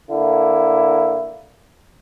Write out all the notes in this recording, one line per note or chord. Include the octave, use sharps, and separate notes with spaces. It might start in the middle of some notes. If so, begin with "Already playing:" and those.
D3 A#3 E4